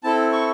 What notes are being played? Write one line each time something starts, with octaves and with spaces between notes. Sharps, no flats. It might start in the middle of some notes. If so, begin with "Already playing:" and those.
C4 E4 A4 A5
C#6